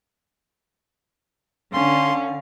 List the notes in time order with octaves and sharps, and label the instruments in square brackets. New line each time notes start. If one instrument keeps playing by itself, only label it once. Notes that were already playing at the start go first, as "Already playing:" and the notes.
[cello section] D3 [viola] C#4 [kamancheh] F5 [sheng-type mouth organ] C6